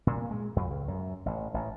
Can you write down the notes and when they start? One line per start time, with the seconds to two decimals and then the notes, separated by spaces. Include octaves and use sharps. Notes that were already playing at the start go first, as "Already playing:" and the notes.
0.07 A#2
0.31 G#3
0.56 F2
0.71 C#2
0.88 F#2
1.26 A1
1.54 A1